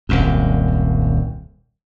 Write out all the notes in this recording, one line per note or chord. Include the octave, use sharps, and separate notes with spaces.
D#1 C2 F#2